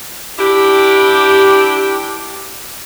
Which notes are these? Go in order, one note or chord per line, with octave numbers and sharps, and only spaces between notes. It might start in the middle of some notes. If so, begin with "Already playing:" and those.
D4 E4 G4